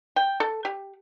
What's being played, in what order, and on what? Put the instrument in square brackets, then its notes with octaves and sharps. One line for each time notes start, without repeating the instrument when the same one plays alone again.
[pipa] G5
A4
G4